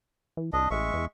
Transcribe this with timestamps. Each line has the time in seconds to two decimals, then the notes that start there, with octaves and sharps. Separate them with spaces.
0.37 E3
0.53 C2 D4 D#5
0.71 A1 G#3 E5 C#6
0.94 E2